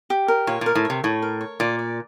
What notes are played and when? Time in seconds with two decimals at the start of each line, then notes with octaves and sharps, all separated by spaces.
0.10 G4
0.28 A#4
0.47 A#2 C#5
0.61 A#2
0.66 A#4
0.75 A2
0.85 C3 C#5
1.04 A2 C#5
1.22 A#4
1.41 C#5
1.60 A#2 D5
1.79 D5